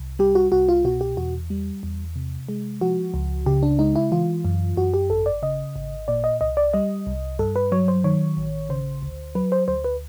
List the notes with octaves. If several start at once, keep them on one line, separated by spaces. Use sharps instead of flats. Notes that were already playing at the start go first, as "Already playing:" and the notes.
Already playing: C2
G3 G4
F#4
C2 F#4
F4
B2 F#4
G4
E2 F#4
G3
E2
C3
G#3
F3 F#4
C#2
C#3 G4
D4
G#3 D#4
E4
E3 F4
F#2
F#2 F#4
G4
G#1 A4
D5
C#3 D#5
G#1
A#2 D5
D#5
C2 D#5
D5
G3 D#5
C2
G2 A4
B4
F#3 C#5
C5
D#3 C#5
A1
C#3 C5
D2
F#3 B4
C5
D2 C5
B4